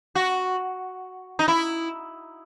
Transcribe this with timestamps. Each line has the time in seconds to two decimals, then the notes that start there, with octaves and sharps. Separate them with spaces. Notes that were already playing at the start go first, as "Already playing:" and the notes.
0.15 F#4
1.39 D#4
1.48 E4